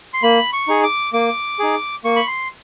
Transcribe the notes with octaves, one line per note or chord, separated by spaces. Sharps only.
C6
A#3 B5
C#6
D#4 G#4
D6
A#3 D6
D#4 G#4
A#3 C#6
B5
C6